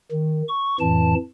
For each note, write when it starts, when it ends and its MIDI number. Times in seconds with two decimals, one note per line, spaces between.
0.11 0.42 51
0.48 0.76 85
0.80 1.15 41
0.80 1.15 45
0.80 1.15 52
0.80 1.15 81